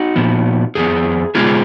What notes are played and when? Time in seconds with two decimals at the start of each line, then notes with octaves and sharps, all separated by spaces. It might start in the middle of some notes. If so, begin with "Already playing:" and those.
Already playing: D#4 F#4
0.16 A#2 F3 B3
0.75 F2 F3 B3 G#4
1.35 B2 G#3 B3 F4 G#4